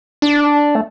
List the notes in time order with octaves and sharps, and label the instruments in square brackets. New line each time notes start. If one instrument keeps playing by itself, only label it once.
[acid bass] D4
A3